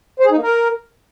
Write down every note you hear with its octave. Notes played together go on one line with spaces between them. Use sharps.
C5
G#4
D#4
A#3
A#4